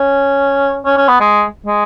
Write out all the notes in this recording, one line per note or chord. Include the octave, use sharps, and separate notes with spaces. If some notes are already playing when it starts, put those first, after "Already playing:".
Already playing: C#4
C#4
C#4
B3
G#3
G#3